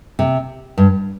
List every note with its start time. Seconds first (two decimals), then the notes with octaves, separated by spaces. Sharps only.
0.19 C3
0.78 G2